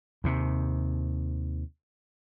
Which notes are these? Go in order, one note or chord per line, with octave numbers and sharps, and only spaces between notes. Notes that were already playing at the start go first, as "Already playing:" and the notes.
D#2 C3